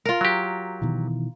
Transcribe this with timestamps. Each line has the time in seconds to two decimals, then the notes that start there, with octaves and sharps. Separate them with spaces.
0.05 F4 A#4
0.21 F#3 G4
0.82 B2 D#3 E3